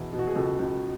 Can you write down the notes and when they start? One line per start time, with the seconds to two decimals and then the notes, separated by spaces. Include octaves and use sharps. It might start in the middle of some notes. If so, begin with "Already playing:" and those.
Already playing: E2 B2 E4 G#4
0.13 B2
0.19 F#4
0.27 G#4
0.36 C#2 F#4 A4
0.59 C#2